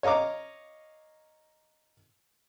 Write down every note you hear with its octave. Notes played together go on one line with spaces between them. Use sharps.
C#5 D#5 F5 A#5 D6